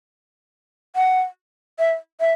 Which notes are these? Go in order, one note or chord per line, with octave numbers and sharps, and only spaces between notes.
F#5
E5
E5